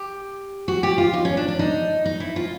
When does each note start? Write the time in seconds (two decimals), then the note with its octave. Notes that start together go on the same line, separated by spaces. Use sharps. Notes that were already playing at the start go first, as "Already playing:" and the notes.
Already playing: G4
0.68 F#4
0.83 G4
0.98 F4
1.13 D#4
1.25 C#4
1.37 D4
1.48 D4
1.59 D#4
2.06 D#4
2.20 E4
2.36 F4